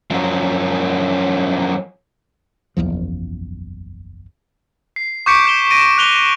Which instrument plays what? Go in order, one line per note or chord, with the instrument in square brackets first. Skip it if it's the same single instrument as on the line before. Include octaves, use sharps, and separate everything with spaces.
[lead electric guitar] F#2 F3
[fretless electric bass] F#1 B1 E2 F3
[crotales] C7
C#6 D6 G6 B6 C#7 D7
G6 E7 G7
A#6 D7 D#7
F#6 F7 G7